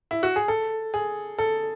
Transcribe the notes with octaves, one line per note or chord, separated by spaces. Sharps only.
E4
F#4
G#4
A4
G#4
A4